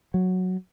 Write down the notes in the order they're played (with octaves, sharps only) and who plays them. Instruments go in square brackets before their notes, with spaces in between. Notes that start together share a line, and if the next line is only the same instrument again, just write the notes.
[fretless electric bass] F#3